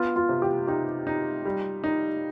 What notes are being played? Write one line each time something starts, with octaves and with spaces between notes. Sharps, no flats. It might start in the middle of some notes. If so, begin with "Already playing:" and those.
Already playing: B3 F4
F4
C3
G4
D#4 G4
D#4
G3
D#4